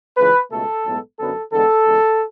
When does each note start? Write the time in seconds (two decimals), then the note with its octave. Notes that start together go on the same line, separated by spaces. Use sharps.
0.17 C#2 C#3 E3 B4
0.51 C#2 B2 A3 A4
0.85 B1 A2 G#3 B3
1.19 F#2 D3 F#3 B3 A4
1.52 E2 D3 G#3 B3 A4
1.86 E2 C#3 G#3